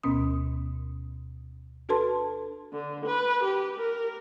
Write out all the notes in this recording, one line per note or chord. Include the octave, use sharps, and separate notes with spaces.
D2 B2 B3 C#4 D#6
D4 F#4 A4 B4 A5 C6
D3
B4
G4
A#4